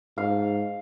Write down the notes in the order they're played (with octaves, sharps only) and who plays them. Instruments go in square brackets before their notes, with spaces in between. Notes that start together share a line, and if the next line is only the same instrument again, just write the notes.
[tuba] G#2 [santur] F5